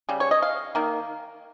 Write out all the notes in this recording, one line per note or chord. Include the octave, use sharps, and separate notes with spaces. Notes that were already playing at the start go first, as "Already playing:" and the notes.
C#3 G3
C#5
D#5
F5
D#3 A#3